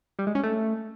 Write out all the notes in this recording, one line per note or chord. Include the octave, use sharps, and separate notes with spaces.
G3
G#3
C#4
A3